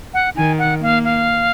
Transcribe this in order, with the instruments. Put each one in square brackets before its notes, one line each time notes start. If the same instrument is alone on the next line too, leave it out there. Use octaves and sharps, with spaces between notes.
[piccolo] F#5
[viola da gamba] D#3 [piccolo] G#5
[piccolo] F#5
[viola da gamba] A#3 [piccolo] F5
[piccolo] F5